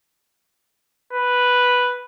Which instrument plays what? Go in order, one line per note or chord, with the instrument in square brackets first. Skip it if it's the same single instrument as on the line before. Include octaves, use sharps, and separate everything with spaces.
[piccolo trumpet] B4